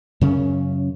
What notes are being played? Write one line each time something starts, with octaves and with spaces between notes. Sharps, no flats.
F#2 C#3 C#4